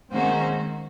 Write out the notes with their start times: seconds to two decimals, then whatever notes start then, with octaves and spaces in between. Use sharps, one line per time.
0.12 D#3 G#3 A#3 C4 C#4 F#4 C5